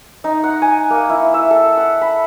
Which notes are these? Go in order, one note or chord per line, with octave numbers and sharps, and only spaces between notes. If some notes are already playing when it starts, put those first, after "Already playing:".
D#4
F#5
G#5
A#3
E4
E5
A4
F#5
B5